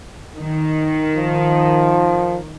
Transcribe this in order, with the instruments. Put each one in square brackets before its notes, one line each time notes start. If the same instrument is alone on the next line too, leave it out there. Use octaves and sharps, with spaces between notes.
[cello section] D#3
[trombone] F3